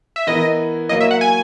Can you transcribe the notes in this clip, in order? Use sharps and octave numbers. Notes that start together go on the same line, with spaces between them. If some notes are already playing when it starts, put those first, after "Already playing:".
E5
E3 B3 E4 A#4 D#5
F#3 A#3 E4 A#4 C#5 D#5
E5
F#5
G#5